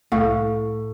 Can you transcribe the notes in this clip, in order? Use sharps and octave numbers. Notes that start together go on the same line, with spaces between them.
C2 A2 A3 F5